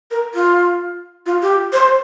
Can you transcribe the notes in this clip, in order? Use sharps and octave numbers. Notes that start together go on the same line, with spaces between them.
A#4
F4
F4
G4
C5